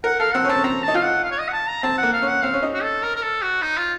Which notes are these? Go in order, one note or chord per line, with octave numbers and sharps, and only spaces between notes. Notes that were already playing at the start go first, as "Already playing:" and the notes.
A#4 F#5
A4 F5
C4 F#5
C#4
C4 A5
C#4
C4 A#5
D#4 A5
F4 F5
F#5
F5
C#5
D#5
F#5
A5
A#5
C4 A5
F#5
A#3
F5
C#4
F#5
C4 F5
C#4
D#4
F#4
A4
A#4
A#4
A4
F#4
D#4
F4